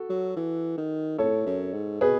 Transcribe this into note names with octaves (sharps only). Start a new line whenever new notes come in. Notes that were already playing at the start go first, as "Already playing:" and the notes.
Already playing: F#4 A4
F#3
E3
D#3
A2 A4 C#5
F#2
G#2
B2 G#4 B4